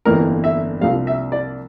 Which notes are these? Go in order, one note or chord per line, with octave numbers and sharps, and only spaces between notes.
G1 F2 E3 A#3 D4 A#4
E5
C2 C3 F3 A#3 D4 F5
E5
D5